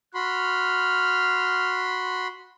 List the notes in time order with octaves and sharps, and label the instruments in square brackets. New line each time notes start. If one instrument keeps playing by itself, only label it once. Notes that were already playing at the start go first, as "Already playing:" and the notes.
[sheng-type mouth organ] F#4 B5 C6 [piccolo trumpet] F6